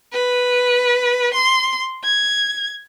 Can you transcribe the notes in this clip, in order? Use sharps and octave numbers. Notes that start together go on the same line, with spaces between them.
B4
C6
G#6